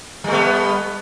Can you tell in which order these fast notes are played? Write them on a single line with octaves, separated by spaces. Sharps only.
G3 A3 B3